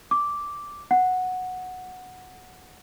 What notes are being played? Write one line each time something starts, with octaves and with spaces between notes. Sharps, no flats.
D6
F#5